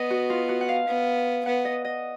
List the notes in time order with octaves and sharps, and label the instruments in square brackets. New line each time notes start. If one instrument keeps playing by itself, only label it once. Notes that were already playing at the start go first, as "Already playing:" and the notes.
Already playing: [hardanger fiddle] B3 [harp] D#5
[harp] F#4
F4
F#4
F#5
F5
[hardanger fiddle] B3
[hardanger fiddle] B3 [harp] F#5
[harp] D#5
D#5